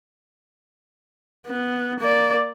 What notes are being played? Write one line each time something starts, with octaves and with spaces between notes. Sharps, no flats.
B3
A#3 D5